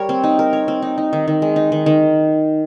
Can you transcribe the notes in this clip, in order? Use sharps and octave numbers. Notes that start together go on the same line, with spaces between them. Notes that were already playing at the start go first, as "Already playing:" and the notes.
Already playing: G3 A#4 C#5
C4
D#4
A#4
C#5
C4
D#4
D#4
D#3
D#3
G#3
D#4
D#3
D#3